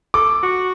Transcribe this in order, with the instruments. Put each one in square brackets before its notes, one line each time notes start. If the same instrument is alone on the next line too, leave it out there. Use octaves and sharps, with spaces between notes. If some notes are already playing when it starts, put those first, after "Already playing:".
[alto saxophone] A4 [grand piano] D6
[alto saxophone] F#4